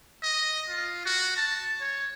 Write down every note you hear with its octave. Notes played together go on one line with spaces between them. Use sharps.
D#5
F4
F#4
A5
C#5